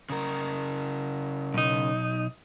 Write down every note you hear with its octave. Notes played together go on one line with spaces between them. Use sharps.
C#3 A#4
B1 D#4